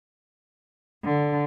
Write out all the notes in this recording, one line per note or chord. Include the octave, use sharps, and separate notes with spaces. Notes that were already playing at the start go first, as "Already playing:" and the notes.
D3